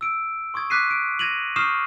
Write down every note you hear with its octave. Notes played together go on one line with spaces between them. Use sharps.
E6 D7
C6 C#6 D#6 G#6
D6 F#6 B6 C7 D#7
D7
G#6 A#6 D#7 F7 F#7
C#6 D#6 F6 G6 C7 E7